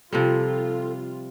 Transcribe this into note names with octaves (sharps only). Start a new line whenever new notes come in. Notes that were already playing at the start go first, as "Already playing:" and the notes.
C3 F3 G3 F4 A4